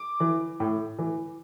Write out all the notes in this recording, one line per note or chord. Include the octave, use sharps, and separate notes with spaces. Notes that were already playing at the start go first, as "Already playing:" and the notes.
Already playing: D6
E3
A2
E3